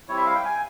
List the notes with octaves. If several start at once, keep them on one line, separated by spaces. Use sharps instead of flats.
G3 C4 E4 C#5
E5
F5
G5
G#5